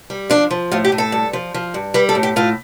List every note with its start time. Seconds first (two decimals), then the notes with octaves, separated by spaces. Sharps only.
0.10 G3
0.30 F3 D4
0.51 F3
0.71 A2 F4
0.85 G4
0.92 A2
0.98 A4
1.12 G2
1.33 F3
1.54 F3
1.74 G2
1.94 G3 B4
2.09 A4
2.15 A2
2.23 G4
2.36 A2 F4